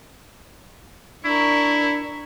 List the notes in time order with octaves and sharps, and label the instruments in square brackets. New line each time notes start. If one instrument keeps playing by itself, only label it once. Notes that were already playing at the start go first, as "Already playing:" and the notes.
[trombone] D4 [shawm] E4 [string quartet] A#4 C#6